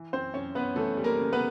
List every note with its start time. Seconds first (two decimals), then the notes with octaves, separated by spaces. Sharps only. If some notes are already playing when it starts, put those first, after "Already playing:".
Already playing: E3
0.13 F#2 C4 C5
0.34 F#2 C#4 C#5
0.55 F#2 B3 B4
0.76 E3 A3 A4
0.97 G3
1.04 A#3 A#4
1.18 C#3
1.33 B3 B4